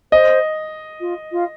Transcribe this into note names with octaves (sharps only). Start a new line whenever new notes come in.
C5 D#5
F4
F4